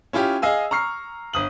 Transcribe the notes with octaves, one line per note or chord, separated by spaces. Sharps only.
C#4 E4 F4 G4
G#4 D#5 F5 G#5 E6
A#5 C#6 F6 C7
G1 D#6 F#7